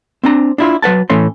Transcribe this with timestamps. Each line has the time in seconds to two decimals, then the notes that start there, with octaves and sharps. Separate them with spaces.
0.24 C4 D4 A#5
0.58 D4 E4 F4
0.82 F#3 B4 F#5 A5
1.10 A2 E3 A3 C#4 C6